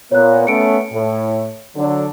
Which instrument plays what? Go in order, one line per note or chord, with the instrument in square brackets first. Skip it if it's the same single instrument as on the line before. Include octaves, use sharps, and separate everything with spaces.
[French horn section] A#2 B3 [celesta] C#5 F#6
[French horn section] A3 B3 C#4 [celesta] C#7 D7
[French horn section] A2
D3 F#3 D4